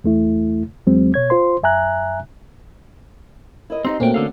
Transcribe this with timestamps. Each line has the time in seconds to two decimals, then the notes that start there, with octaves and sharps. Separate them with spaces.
0.04 E2 A3 E4
0.87 E2 F#3 G#3 C4
1.14 B2 C#5 G#6
1.30 F4 C5 C6
1.63 F#2 E5 G#5 A#5 F#6
3.70 E4 A#4 D#5
3.85 C4 D#4 G4 D#5 C6
4.00 A#2 A3 A#3 C4 C#4 F#4 G5
4.14 D3 A4 F5